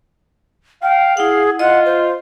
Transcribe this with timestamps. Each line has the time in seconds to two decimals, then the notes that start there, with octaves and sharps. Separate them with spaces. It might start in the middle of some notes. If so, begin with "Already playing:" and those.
0.82 F5 G5
1.17 E4 G#4 F#5
1.59 F4 D#5 F#5
1.86 C5